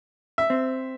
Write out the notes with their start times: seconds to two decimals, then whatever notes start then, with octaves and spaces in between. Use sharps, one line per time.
0.38 E5
0.50 C4